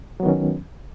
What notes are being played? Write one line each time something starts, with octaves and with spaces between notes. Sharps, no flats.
D#3 F#3 B3 C#4